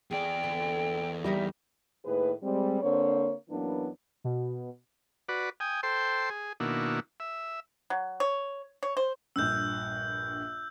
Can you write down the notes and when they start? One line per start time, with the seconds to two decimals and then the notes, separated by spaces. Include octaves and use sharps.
0.11 E2 G#4 D5 G5
0.43 D3
1.24 G3 A#3 D#4 A#4 E5
2.05 A2 D#3 A#3 G#4 B4
2.43 G3 G#3 C4
2.82 D3 A#3 C4 C5 C#5
3.50 F#2 E3 F#3 A#3 B3 D4
4.24 B2
5.29 F#4 B4 D5
5.60 G5 G#5 D#6
5.83 A4 C5 G5 C6
6.30 G#4
6.60 B2 D#3 A#3 D4 E4 F#4
7.20 E5
7.90 F#3
8.20 C#5
8.83 C#5
8.97 C5
9.36 A#1 G2 E6 F#6 G6